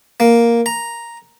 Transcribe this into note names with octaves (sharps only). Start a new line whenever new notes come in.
A#3
A#5